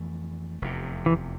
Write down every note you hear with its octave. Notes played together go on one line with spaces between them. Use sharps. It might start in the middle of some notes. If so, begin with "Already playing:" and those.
Already playing: F2 E3 A3
F1 E2 C3
E3